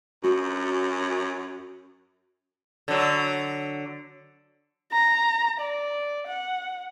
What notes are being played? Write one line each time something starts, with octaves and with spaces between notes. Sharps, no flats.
F#2 F#4
D3 F#3
A#5
D5
F#5